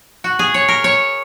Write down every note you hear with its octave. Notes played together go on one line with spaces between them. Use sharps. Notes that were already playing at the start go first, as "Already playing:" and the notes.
F#4
G#4
C#5
A#4
C#5